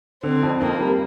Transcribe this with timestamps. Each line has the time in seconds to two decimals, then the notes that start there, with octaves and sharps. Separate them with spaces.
0.23 D3 C4
0.43 F2
0.61 F2 A#3
0.81 G3